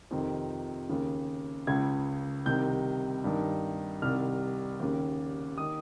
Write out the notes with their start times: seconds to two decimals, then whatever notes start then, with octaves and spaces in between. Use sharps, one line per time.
0.11 F2 C3 D#3
0.89 D#2 C#3
1.67 C#2 C#3 G#6
2.46 C2 C3 D#3 G6
3.24 G2 D#3
4.02 C2 C3 D#3 F6
4.80 D#2 C#3
5.58 D#3 D#6